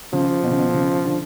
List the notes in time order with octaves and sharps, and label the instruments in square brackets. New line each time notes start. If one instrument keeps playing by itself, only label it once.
[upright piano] C#3 [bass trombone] F3
[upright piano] B2
C#3
B2
C#3
D3